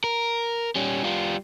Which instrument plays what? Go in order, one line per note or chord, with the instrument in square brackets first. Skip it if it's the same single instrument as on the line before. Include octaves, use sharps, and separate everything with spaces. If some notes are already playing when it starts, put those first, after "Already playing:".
[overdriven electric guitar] A#4
G3 C#4
G3 F4